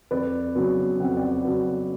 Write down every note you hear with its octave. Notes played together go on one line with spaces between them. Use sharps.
F2 B4 D5
C#3 F#3 B3
F2 F#5
D5 F#5
C#3 F#3 B3